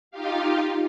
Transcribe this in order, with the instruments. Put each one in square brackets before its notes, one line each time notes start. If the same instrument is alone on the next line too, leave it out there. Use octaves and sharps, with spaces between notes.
[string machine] D#4 F4 G4 F5